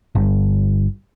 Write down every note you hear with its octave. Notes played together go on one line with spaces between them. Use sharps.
G1